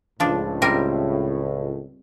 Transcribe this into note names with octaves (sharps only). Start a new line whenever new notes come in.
C#2 A2 F3 D4
G3 C4 A#4